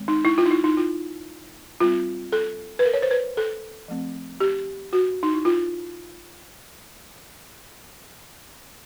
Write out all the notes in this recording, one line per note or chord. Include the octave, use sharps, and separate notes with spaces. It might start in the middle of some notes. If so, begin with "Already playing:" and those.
Already playing: D#3 G#3 C4
D#4
E4
F4
D#4
E4
D#4
F4
G3 C4 F4
A4
B4
A#4
C#5
C5
B4
A4
F3 A3 C4
G4
F#4
D#4
E4
F4